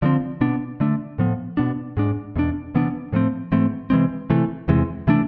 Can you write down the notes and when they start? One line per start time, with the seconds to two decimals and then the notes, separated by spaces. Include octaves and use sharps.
0.02 D3 F3 G#3 C4
0.41 B2 B3 D4
0.80 D3 A3 D4
1.18 A2 F3 B3
1.57 B2 B3 D4
1.97 G#2 G#3 D4
2.36 E2 B2 B3 D4
2.74 C3 E3 B3 D4
3.13 A2 F3 A3 C4
3.52 G#2 E3 A3 C4
3.90 C3 E3 G#3 C4
4.30 C3 E3 A3
4.68 E2 C3 E3 G#3
5.07 C3 E3 A3 D4